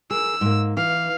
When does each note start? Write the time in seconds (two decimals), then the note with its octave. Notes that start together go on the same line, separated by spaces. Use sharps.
0.11 G#4 A#4 E6
0.41 G#2 A#3
0.77 E3 F5